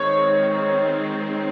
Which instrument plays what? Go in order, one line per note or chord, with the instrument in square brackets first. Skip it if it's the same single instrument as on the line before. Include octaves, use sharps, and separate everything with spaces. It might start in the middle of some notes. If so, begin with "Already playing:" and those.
Already playing: [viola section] D#3 G#3 C4 [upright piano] C#5